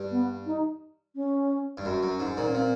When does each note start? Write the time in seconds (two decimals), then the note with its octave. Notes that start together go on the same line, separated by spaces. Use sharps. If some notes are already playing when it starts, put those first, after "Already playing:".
Already playing: G2
0.11 B3
0.46 D#4
1.15 C#4
1.77 G2
1.85 F#2
2.03 F#2
2.20 G#2
2.37 A#2
2.47 C#4
2.54 A#2 C4